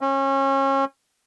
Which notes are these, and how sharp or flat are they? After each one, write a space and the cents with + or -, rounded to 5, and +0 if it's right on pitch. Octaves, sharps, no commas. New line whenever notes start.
C#4 -30